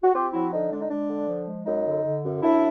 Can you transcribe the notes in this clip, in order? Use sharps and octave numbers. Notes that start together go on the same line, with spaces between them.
F#4
C4 F4 G4
F3 E4 F#4
D3 D#4
G#3 D4
D#4
G#3 D4
D3
F3
G#3
F#2 D#4
D3
D3
F#2
F#2 D4 E4